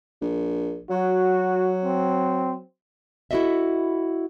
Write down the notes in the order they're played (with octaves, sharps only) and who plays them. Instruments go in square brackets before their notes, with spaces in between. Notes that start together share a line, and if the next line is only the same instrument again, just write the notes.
[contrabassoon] A#1
[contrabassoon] F#3 [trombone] F#4
[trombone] C4
[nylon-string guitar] E4 F#4 G4 A4 D#5 E5